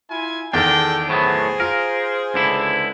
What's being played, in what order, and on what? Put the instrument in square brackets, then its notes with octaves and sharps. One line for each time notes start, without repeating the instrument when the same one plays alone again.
[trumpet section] E4 F4 G#5
[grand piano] E2 D#3 [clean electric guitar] D4 [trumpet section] G#4 A4 G5
[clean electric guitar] A2 F#3 B3 [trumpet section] G#4 C5
[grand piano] F4 [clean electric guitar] A#4
[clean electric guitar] C#2 D3 E4